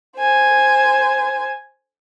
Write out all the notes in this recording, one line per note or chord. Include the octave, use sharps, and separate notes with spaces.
C5 G#5